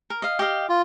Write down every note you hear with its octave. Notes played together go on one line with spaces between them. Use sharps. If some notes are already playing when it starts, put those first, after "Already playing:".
A#4
D#5 F5
G4 D#5 F5
F4